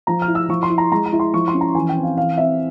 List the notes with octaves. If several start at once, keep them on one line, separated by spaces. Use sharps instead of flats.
F3 A#5
F6
E4
E6
F3 C#6
C6
E4
A#5
G#3 A#5
A#5
E4
C6
F3 C#6
C6
C#4
A#5
E3 G#5
G5
C4
F5
E3 F5
C4 E5